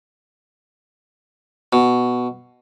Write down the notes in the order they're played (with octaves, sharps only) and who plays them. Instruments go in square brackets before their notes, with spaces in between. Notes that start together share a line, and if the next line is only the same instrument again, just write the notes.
[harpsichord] B2